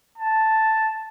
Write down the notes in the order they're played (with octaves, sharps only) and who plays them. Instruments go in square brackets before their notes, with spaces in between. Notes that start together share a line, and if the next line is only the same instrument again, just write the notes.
[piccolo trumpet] A5